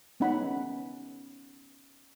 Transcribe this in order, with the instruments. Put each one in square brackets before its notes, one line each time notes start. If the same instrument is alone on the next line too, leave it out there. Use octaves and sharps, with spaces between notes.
[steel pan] B3 C#4 D#4 F#5 B5